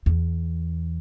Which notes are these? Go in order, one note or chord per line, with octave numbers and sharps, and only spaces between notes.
E2